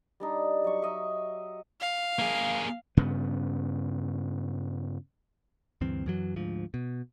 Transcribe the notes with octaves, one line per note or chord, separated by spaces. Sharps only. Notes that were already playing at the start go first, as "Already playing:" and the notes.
G3 D4 D#4
F#3 C#6
D#5 E5
F5
A#3 G#4
G2 C#3 B3
D2 G2 E3 C4
F#2 E3 F#3
D2 G#2 F3
B2